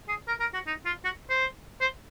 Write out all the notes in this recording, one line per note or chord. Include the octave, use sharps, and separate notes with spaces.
G#4
A#4
A#4
F#4
D#4
F4
F#4
C5
C5